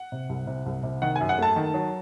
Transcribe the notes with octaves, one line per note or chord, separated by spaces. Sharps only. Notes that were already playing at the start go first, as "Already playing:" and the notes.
Already playing: F#5
C3
C2
C3
C2
C3
D#3 F#5
F#2 G#5
F#5
A3 A5
D#3
F#3